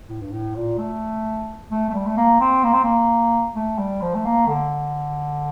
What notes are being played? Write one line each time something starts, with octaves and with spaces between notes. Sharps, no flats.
A2
G2
A2
A#2
A3
A3
A3
G3
A3
A#3
C4
A#3
C4
A#3
A3
G3
F3
A3
A#3
D3